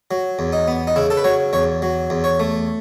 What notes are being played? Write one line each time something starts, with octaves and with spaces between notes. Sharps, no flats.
F#3
E2
D#4
B3
D#4
C#3 E4
A4
B4
F#3 C#5
E2 C#5
F#3
E2
C#5
A3